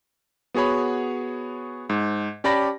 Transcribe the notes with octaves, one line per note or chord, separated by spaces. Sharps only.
B3 F#4 G#4 C#5 B5
G#2
C#4 G4 D5 A5 B5 A#6